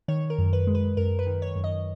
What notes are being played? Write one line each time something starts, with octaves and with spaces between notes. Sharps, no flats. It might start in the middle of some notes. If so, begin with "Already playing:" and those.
D#3 C#5
A#4
F#2
B4
G#3
B4
F#2 A#4
B4
D#3
C#5
F#2
D#5